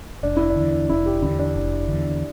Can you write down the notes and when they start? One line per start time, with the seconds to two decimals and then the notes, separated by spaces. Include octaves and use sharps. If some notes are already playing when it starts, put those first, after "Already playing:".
0.23 F1 D4
0.37 E4
0.50 D4
0.56 E2 D3
0.89 F1 E4
1.06 G4
1.22 E2 D3 E4
1.39 D4
1.56 F1
1.88 E2 D3